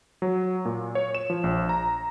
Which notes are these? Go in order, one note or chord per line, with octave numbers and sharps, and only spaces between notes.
F#3
A#2
C#5
E7
F3
A#1
A#5